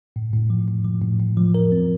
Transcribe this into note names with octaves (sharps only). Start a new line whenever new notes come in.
A2
A2
F3
A2
F3
A2
A2
F3
A#4
C4